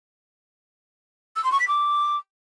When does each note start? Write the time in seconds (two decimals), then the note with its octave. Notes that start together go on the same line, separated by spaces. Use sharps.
1.35 E6
1.43 C6
1.51 C#6
1.59 B6
1.67 D6